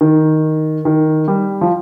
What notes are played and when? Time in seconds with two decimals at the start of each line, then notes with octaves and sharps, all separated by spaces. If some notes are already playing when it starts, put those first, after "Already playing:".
0.01 D#3
0.85 D#3
1.28 G3
1.61 F3